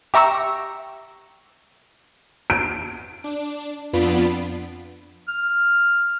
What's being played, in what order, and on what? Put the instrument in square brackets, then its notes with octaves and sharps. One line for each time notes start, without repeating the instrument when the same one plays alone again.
[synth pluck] G4 E5 A#5 C#6 E6
[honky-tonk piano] D7
[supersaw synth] D4
F2 B3 D4 F4 B5 D7
[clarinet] F6